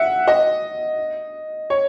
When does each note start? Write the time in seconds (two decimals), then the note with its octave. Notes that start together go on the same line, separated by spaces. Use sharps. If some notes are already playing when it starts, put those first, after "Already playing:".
Already playing: E5 F#5
0.28 D#5
1.70 C#5